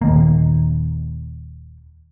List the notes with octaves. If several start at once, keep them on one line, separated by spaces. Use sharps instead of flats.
D#1 D#3 A#3